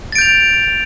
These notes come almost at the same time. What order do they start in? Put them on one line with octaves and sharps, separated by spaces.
A6 D7 G6 F7